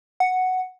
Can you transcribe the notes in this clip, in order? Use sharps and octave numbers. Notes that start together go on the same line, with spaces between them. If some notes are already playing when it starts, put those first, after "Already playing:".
F#5